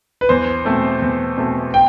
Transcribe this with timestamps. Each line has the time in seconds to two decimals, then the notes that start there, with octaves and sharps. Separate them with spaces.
0.21 B4
0.29 E2 C5
0.65 B2 A3 C4
1.02 E2
1.38 B2 A3 C4
1.74 G5